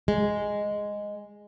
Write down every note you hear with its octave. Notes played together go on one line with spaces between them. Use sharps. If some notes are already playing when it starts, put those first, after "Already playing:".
G#3